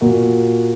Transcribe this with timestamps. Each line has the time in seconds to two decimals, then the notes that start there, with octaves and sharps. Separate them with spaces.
0.01 A#2 F#4 A#4